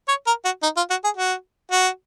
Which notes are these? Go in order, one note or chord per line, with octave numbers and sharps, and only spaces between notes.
C#5
A#4
F#4
D#4
F4
F#4
G#4
F#4
F#4